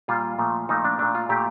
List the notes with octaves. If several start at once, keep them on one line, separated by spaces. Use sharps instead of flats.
A#2 G3 F4
A#2 F3 A3
A#2 F3 A3 D#4
D4
A#2 A3 D4
F4
A#2 A3 G4